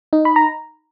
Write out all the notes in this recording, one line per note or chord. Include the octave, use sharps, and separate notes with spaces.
D#4
B5
A#5